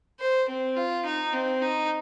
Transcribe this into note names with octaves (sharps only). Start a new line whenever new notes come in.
C5
C4
F4
D#4
C4
D#4